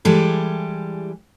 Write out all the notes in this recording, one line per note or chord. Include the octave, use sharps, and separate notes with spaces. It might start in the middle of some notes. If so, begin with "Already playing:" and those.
E3 G3 G#3 G4 A4